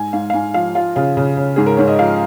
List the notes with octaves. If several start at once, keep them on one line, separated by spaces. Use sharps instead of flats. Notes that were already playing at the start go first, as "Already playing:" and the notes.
Already playing: G#2 G#5
G#2 F5
F5
G#2 G#5
F3 F5
F3 F4
C#3 F4
C#3
C#3
G#2 G#4
A#4
G#2 C#5
D#5
F3 F5